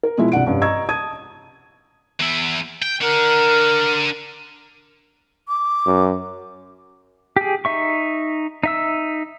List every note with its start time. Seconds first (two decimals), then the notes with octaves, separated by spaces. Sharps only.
0.03 A#4
0.18 B2 F3 G#3 E4 F4
0.32 C2 D4 F#5 D7
0.46 F1 G2 C#4
0.61 D#5 A#5 C#6 E6 G#6
0.89 A5 D#6 G#6 D#7
2.20 E2 E4
2.82 G5
3.01 D4 A#4 F#5
5.48 D6
5.86 F#2
7.36 G4 G#4
7.65 D#4 E5 C#6
8.63 D#4 E5 E6